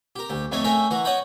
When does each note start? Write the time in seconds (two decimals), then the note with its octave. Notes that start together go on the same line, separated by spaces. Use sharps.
0.16 G4 A#4
0.29 D2 G4
0.52 F2 A3 D#4 A4 C#5
0.64 A3 C#4 A#4 E5 F5 G5
0.91 E3 F#4 A#4
1.05 C#5 D#5 F#5 G5 B5